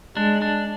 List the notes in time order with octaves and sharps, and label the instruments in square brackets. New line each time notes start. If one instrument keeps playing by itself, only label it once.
[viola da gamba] G#3 [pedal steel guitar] D4
[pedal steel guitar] D4